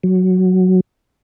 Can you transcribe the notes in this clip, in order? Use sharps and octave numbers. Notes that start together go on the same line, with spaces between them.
F#3